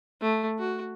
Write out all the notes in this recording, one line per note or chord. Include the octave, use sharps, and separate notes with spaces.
A3
F#4